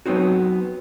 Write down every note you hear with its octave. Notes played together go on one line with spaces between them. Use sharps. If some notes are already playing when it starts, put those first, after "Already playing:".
F#3 G#3 B3 C4 D#4 F#4